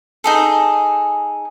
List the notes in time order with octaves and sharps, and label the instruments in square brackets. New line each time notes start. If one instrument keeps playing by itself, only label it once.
[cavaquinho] D#4 G#4 A4